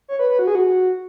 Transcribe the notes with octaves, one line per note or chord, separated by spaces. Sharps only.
C#5
B4
B4
F#4
G#4
F#4